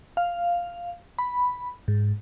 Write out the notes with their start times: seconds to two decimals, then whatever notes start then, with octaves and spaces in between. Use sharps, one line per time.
0.17 F5
1.19 B5
1.88 G#2